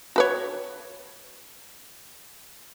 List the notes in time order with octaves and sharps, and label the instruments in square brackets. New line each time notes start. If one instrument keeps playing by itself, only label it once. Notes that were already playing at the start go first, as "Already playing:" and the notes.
[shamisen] F#4 B4 C#5